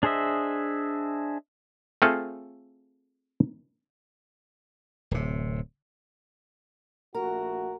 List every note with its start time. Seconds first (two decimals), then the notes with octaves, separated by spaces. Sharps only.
0.03 D4 G#4 C5 D#5 E5
2.02 A3 C4 F4 G#4 A4 F5
5.11 D1 C3
7.15 A#1 A3 F#4 A#4